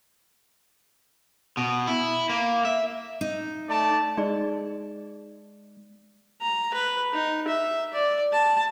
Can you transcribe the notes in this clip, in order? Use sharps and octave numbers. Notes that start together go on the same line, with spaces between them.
B2
E4
A#3
E5
D#4
A3 D5 A5
G#3 D#4 G#4 D5
A#5
B4
D#4
E5
D5
A5